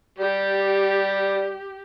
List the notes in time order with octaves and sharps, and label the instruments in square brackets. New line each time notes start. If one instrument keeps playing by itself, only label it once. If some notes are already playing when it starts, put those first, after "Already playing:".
[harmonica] G3 [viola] G4